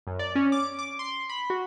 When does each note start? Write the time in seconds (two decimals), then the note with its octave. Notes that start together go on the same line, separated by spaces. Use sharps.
0.07 F#2
0.19 D5
0.35 C#4
0.52 D6
0.79 D6
0.99 C6
1.29 B5
1.50 F#4